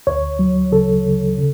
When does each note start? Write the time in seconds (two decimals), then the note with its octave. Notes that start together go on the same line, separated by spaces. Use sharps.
0.07 D2 C#5
0.39 F#3
0.72 C#3 A4
1.05 C#3
1.37 C#3